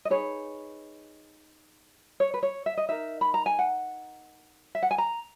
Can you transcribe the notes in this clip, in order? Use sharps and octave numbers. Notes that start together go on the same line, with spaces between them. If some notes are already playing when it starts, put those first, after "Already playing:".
D#5
D#4 G#4 B4 C#5
C#5
B4
C#5
E5
D#5
D#4 A#4 E5
B5
A#5
G#5
F#5
E5
F#5
G#5
A#5